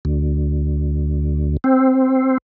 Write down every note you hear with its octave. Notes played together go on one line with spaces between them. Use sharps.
D2
C4